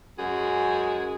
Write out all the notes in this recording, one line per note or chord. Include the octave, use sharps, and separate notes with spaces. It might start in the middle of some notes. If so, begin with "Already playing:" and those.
F#2 G#3 F#4 G#4